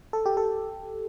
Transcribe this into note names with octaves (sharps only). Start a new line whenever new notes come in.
A4
G4
A4